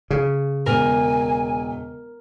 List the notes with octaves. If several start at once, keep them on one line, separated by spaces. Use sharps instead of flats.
C#3
E1 A#4 G#5